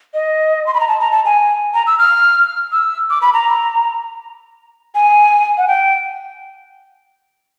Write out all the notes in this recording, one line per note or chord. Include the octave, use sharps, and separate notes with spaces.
D#5
C6
B5
A#5
A5
A#5
A5
G#5
A#5
E6
F6
E6
D6
B5
A#5
G#5
F#5
G5